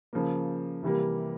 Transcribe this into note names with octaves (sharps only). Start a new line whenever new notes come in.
C#3 F3 A#3
C3 E3 G3 A#3